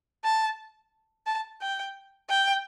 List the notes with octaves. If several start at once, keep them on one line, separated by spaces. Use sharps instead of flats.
A5
A5
G5
G5